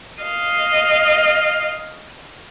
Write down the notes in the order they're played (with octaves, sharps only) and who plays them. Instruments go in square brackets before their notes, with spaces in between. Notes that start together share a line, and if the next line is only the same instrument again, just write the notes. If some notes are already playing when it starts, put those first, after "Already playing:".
[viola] D#5 F5